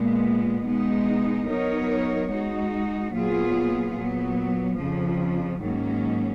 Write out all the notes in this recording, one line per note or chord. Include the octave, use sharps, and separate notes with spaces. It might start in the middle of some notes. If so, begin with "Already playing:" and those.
Already playing: A#2 G#3 B3
B2 G#3 B3 D#4
F#3 B3 D#4 A#4 C#5
G#3 D#4 F#4
A#2 F#3 B3 F4 G#4
A#2 F#3 B3
F2 C#3 F3
G#2 D#3 F#3 A#3 C#4